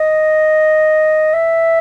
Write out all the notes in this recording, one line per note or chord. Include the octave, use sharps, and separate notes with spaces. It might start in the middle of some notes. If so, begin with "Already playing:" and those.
Already playing: D#5
E5